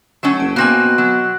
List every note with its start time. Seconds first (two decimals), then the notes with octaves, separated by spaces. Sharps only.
0.23 F#3 A3 C#4
0.40 F#1 D7
0.56 B2 A#3 C4 G#5 F#6 A#6 F#7
0.98 F#3